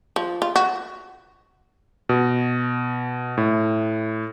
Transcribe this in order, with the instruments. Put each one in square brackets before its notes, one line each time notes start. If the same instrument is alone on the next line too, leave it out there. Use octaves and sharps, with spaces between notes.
[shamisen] F3
F4
F#4
[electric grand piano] B2
A2